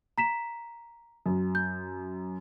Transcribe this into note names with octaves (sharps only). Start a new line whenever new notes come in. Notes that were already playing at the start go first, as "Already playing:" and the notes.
A#5 B6 E7
F#2
G6